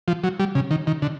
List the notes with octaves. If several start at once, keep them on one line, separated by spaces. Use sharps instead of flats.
F3
F#3
G3
C#3
D#3
D#3
D3